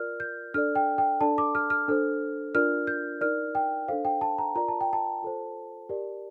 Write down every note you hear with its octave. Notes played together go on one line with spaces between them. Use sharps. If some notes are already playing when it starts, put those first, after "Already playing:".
Already playing: F4 A#4 D5 F6
G6
D4 A4 D5 F6
G5
G5
D4 A4 D5 A5
D6
F6
F6
D4 A4 C5
D4 F4 A#4 D5 F6
G6
D#4 A#4 D5 F6
G5
D4 A4 C5 F5
G5
A5
A#5
F4 A#4 D5 A#5
A5
G5
A5
F4 A4 C5
G4 A#4 D5